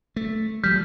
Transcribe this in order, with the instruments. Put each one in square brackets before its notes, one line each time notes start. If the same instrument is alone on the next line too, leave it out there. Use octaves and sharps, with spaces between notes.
[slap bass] A3
[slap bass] F3 G3 [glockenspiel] F6 G6 B6